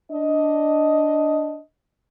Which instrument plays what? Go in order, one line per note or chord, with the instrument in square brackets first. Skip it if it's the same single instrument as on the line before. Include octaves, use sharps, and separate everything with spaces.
[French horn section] D4 D#5